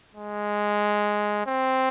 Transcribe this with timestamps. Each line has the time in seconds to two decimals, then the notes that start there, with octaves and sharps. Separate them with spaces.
0.15 G#3
1.46 C4